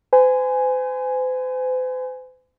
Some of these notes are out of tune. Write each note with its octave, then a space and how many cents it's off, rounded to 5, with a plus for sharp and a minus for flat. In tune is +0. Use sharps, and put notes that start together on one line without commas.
C5 -45 G#5 +0